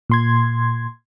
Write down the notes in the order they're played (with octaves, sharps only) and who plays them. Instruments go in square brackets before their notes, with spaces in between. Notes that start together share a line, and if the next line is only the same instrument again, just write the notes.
[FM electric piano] A#2 C6 G#6